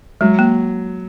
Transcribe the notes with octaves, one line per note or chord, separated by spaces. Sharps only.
F#3 G#3
A#3